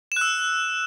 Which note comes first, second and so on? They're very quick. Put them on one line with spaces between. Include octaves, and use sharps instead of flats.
E7 F#6 E6